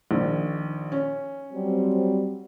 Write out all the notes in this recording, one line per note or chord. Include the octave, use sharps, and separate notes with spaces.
A#1 D#3
C#4
F#3 G3 C4